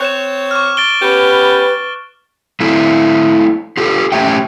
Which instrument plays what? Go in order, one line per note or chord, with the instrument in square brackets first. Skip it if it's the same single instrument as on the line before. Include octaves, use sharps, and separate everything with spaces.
[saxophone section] C4 C#5 [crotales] F#6 E7
[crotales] C#6 D6 F6
A6 D7 G7
[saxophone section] B3 C#4 G4 [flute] B4
[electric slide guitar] A3 C4 E4
F4 G4 A4
A3 C#4 G4 E5 G5